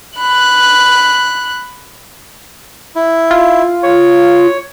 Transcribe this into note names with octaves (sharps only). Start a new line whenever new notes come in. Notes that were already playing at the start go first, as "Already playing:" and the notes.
B5 F#6
E4
F4
C#5